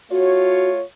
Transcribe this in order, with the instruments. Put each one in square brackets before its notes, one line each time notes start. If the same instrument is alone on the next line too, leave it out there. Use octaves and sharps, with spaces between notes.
[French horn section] A3 F4 C#5 [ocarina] F#4